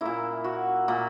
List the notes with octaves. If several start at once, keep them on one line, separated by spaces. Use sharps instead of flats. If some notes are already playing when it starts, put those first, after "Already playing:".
A#2 A#3 E4
F#4
A#2 A#3